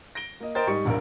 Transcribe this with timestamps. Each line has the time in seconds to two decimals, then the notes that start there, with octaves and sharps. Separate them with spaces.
0.15 A#6 D7 G7
0.40 A#3 D#5
0.55 A#4 C5 D#5 G5 A6
0.68 G#2 G3 D#5 C#6 C#7
0.85 E1 A#1 G2 A#4